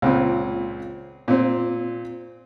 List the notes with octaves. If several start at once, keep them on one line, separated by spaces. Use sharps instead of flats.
C#2 A#2 C4
A#2 C4